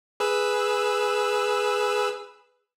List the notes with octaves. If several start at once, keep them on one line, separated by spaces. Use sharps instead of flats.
G#4 B4 E6